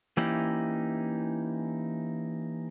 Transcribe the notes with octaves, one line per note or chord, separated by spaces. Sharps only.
E3 A#3 C#4 D#4 E4 G4